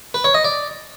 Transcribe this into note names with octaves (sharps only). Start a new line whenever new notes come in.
B4
C#5
D#5
D5